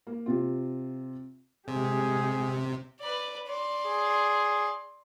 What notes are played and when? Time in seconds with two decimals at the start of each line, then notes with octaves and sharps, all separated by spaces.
0.07 A#3
0.26 C3 F4
1.68 C3 G#3 G4 G#4
3.01 B4 D5
3.48 D5 C6
3.86 G#4